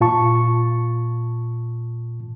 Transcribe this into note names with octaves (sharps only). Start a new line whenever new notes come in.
A#2 F4 A5 C#6